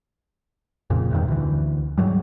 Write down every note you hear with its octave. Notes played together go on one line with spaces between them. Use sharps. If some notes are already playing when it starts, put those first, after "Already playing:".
F2 A#2 C#3
E2 G2 D#3
D2 E3
G#2 F#3 G3